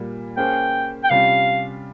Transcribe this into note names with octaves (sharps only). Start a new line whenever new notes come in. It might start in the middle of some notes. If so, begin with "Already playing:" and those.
Already playing: A#2 G3 A#3
A#3 C#4 G#4 C5 G5
G5
C3 G3 C#4 F4 F5